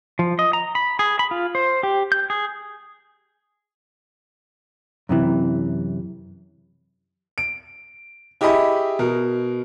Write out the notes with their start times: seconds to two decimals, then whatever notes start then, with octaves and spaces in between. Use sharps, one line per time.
0.19 F3
0.39 D#5
0.53 A#5
0.75 B5
0.99 G#4
1.19 B5
1.31 F4
1.55 C5
1.83 G4
2.12 G6
2.30 G#4
5.09 F#2 C3 E3
7.38 D7
8.41 E4 G4 G#4 D#5 G#5 B5
8.99 B2 A#4